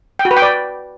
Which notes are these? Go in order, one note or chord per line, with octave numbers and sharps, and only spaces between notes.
G5
F#4
B4
G5
D5